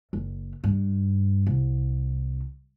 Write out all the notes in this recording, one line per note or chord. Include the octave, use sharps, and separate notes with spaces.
F#1
G2
C2